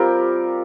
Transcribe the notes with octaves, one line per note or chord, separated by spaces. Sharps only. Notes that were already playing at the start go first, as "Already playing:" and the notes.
Already playing: G3 C4 F4 G4 A#4